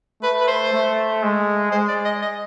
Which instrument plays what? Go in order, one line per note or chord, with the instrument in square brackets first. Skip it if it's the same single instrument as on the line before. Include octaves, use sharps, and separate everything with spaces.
[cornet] A3 [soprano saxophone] B4
[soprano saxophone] B4
C5
[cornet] A3
G#3
[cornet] G#3 [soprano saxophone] C5
[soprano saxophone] D5
D#5
D#5